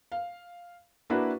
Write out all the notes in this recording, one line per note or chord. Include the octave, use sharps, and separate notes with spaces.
F5
A#3 D4 E4 F#4 B4